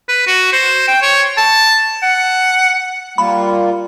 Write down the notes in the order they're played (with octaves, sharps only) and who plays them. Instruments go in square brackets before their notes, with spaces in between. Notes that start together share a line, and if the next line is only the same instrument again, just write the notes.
[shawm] B4
F#4
C5
G5
C#5
A5
F#5
[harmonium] G3 A#3 F4 [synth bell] B5